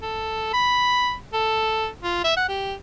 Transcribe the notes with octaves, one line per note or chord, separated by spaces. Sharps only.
A4
B5
A4
F4
E5
F#5
G4